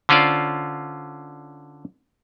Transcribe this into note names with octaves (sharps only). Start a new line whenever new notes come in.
D3 C#4 F4 C5 D5